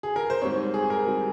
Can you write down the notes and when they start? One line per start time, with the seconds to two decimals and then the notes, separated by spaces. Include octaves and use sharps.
0.03 G#4
0.16 A#4
0.30 C5
0.42 G#2 G3 C4 C#5
0.74 G#4
0.90 A#4
1.07 G3 C4